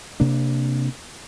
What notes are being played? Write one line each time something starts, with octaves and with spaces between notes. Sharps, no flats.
C3 A#3 D4